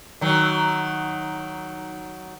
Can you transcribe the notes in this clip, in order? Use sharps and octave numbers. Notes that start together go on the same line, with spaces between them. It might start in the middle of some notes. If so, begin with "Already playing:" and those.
D#3 F#3